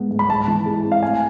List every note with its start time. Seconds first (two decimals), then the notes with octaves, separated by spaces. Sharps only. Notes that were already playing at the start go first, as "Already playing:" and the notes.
Already playing: G#2 G#3 B3
0.11 G#2
0.19 B5
0.30 G#2 A5
0.47 E3
0.66 G#3
0.85 C4
0.92 F5
1.03 A2 G#5